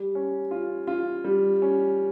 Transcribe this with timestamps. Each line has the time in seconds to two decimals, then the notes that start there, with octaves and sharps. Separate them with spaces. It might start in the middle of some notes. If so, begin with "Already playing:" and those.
Already playing: G3
0.15 C#4
0.51 F4
0.87 F4
1.24 G3
1.62 C#4